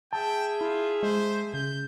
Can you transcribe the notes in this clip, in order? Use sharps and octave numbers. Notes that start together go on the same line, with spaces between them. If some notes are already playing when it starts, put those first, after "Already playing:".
G#4 E5 G5 A5
E4 F4
G#3 C5
C#3 G6